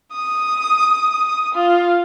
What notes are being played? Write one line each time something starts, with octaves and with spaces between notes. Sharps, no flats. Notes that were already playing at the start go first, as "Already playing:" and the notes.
D#6
F4